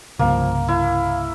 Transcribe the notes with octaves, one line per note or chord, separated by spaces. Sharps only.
C2 G2 C#3 F3 A#3
E4 F5